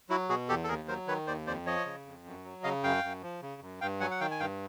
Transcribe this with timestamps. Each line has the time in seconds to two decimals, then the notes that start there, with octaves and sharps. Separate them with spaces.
0.10 F#3 E4 F#4
0.29 B2 F#4 G#4
0.49 E2 G4 A4
0.64 A4
0.68 D#2 G#4 A#4
0.88 F#3 A#4 C5
1.07 D#3 B4 C#5
1.27 D#2 C5 D5
1.46 F2 C5 D5
1.66 F3 C#5 D#5
1.85 C#3
2.05 F2
2.26 F#2
2.44 F#3
2.63 C#3 D#5 F5
2.83 F#2 F5 G5
3.04 F#2
3.22 F3
3.42 C#3
3.61 F#2
3.81 G2 F5 G5
4.00 F#3 F#5 G#5
4.11 F#5
4.21 D#3 F5 G5
4.31 G#5
4.40 G2 F5 G5